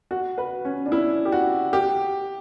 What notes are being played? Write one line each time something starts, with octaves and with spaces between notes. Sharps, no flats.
F#4
B4
C#4
D4
E4
G4
F#4
G4